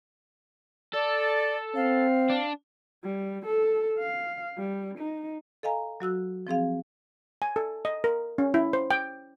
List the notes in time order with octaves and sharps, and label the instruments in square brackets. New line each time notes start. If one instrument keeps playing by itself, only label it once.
[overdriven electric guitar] A4 [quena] D5
[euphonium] C4 [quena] F5
[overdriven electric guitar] D4
[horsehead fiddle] G3
A4
F5
G3
D#4
[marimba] A4 D#5 F5 G#5 A#5
F#3 F#4 E6 F#6
F3 C4 G#4 F5
[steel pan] G#5
A4
D#5
A#4
C#4
E4
C5
G5